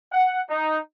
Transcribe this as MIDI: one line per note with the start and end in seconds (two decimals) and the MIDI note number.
0.12 0.40 78
0.49 0.77 63